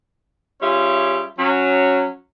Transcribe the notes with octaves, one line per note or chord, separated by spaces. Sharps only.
G3 C#4 F4 G#4 E5
F#3 C#4